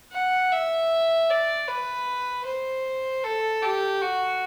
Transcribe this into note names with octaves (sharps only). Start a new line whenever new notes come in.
F#5
E5
D5
B4
C5
A4
G4
F#4